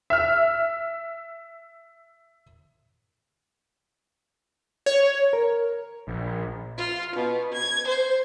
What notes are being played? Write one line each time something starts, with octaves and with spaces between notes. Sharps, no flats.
E5 F6
C#5
A#4
A#1
F4
B2
G#6
C5